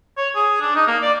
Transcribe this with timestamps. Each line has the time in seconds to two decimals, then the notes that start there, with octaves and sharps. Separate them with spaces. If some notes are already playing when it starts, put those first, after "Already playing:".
0.18 C#5
0.35 G#4
0.61 D4
0.76 D#4
0.87 A#3
1.02 D5